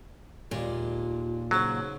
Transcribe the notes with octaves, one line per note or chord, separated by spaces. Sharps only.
D#2 A#2 G#3 D4 F4
G#2 C#3 F#3 C#4